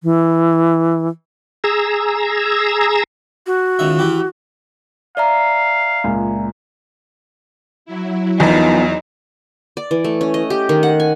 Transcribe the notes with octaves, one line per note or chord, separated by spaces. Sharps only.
E3
G#4 A#5 E6
F#4
C#2 D#3 E5
E3 E4 G4
D5 E5 F5 A#5
C#2 A#2 G#5
F#3 E4
E2 D#3 F3 B3 D#4
D5
E3
A3
C#4
D#5
G4
D#3
F#5
G#5